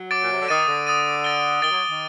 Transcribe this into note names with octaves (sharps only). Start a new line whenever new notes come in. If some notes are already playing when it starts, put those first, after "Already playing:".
Already playing: F#3
D6 A6 D7
A#2
C3
D3
D#3 D#6 A6 D#7
D3
D#6 A6 D#7
A6 D7 G7
D#3 A6 D7 G7
F#3
D#3